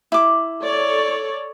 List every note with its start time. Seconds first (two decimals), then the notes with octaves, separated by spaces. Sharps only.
0.12 E4 D6
0.63 A4 C#5 D5